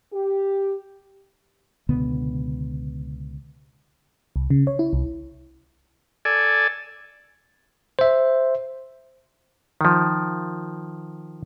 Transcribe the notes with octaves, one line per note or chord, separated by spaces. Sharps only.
G4
C#2 B2 D3 B3
C2
C#3
C#5
E4
C2
A4 D5 G#5
C5 E5
D#3 F3